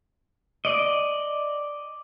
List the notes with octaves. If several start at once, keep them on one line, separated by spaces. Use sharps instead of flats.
D5 D#5